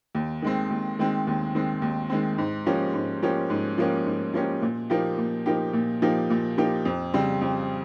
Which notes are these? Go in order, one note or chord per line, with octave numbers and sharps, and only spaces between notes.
D#2
D#3 G#3 C4
D#2
D#3 G#3 C4
D#2
D#3 G#3 C4
D#2
D#3 G#3 C4
G#2
F3 A#3 C#4 G4
G#2
F3 A#3 C#4 G4
G#2
F3 A#3 C#4 G4
G#2
F3 A#3 C#4 G4
A#2
F3 A#3 D#4 G4
A#2
F3 A#3 D#4 G4
A#2
F3 A#3 D#4 G4
A#2
F3 A#3 D#4 G4
F2
C#3 G3 C4
F2